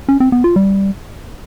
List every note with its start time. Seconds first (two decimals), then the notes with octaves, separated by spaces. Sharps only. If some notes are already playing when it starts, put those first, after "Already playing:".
0.08 C#4
0.20 C4
0.32 B3
0.44 F4
0.56 G3